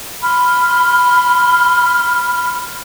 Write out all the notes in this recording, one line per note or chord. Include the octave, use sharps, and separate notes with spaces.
B5 C6 F6